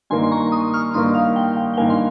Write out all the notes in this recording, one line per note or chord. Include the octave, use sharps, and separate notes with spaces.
G2 D#3 A#3 G#5 C6
C6
A#5 C#6
C6 D#6
C#6 F6
G2 D#3 A#3 C6 D#6
F5
G5
G5
G5
G2 D#3 A#3 F5 G#5
C6